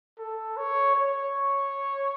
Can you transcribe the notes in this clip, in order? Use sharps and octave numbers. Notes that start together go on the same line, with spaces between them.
A4
C#5
C#5